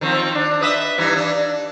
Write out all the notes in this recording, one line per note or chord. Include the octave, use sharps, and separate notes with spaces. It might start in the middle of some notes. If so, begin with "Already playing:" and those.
D#3 F3 C4
D4
B4 D#5 E5
G2 E3 D#4
D4